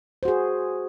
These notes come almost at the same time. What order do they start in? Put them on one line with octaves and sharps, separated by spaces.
C5 F#4 G#4